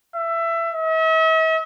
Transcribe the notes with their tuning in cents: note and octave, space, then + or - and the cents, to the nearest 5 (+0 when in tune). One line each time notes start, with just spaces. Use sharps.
E5 +20
E5 -45